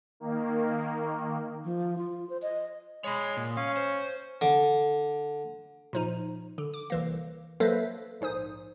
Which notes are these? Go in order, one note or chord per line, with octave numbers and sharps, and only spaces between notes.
D#3 A#3
F3
F4
C5
D#5
G#3 C#5 B5
A#2
C#4 F5
C5
D3
A#2 F3 D#4
D3
D6
C2 E3 A#3
F#3 A#3 A4 B4 C5 E5
A#1 G#2 C5 D#6